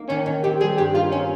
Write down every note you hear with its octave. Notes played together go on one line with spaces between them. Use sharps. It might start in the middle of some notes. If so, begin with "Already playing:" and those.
Already playing: A#3 D#4
D#3 C#4
D#3
C4 G4
G3 G#4
G2 G4
D#4 F4
C4 C#4